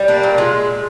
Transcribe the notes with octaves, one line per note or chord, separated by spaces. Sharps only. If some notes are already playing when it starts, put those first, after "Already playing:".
Already playing: G3
A#3 D4
A#2
G#3 F4